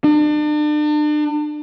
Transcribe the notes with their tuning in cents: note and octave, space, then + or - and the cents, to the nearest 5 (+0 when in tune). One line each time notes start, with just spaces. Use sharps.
D4 +40